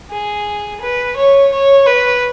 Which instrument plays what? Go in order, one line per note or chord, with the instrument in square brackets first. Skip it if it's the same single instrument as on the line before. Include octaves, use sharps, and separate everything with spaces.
[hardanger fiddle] G#4
B4
C#5
C#5
B4